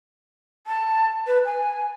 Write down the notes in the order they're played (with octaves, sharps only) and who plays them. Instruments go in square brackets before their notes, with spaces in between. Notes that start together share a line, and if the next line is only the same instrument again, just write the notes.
[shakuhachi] A5
B4
G#5